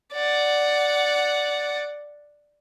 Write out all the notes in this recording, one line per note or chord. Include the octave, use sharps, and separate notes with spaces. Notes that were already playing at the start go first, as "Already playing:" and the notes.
D5 F#5